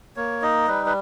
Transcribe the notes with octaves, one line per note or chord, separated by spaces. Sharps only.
A#3 C#5
D#4 D#5
G3 B4
B4